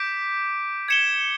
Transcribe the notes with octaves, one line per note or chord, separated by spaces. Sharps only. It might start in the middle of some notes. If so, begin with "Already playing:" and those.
Already playing: D6 G6 B6 D7
G#6 C#7 E7 G7